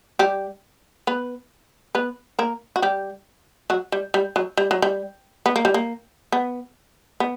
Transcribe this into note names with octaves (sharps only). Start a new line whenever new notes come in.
G3 G4
B3 B4
B3 B4
A#3 A#4
F#4
G3 G4
F#3 F#4
G3
G3
F#3
G3
F#3
G3
B3
A#3
G3
A#3
B3
B3